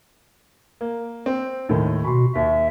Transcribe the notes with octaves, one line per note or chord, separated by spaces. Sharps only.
A#3
C4
D#2 A2 D#3
B2 F#4 B5 C6
D#2 E5